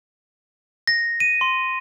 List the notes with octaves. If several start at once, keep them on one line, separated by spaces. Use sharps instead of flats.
A#6
D#7
C6